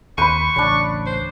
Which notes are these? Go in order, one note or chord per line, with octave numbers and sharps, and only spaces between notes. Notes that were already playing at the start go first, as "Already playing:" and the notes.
D#2 B4 C5 B5 C#6 D#7
A1 D2 C#3 D4 C#5
C5